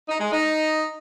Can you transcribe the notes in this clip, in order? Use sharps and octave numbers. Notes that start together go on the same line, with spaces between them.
D#4
G#3
D#4